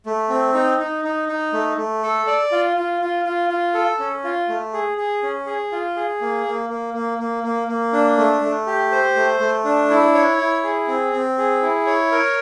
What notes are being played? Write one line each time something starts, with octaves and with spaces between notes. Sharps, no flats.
A3
C4
D#4
D#4
D#4
D#4
A3
A3
A4
D5
F4
F4
F4
F4
F4
A4
C#4
F4
A3
G#4
G#4
C#4
G#4
F4
G#4
A#3
A#3
A#3
A#3
A#3
A#3
A#3
D4
A3
A3
G4
C5
A3
A3
D4
E4
C#5
E4
G#4
C4
C4
G#4
E4
C#5
A#4